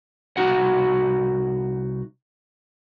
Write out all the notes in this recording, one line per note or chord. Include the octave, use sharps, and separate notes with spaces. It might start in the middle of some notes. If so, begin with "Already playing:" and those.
C2 D#4 F#4 F#5